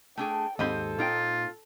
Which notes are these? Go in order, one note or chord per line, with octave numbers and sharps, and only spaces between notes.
A3 D4 G#4 G5
D#2 G#2 C4 A4 C5 D#5 B5
A#2 D#4 F4 G5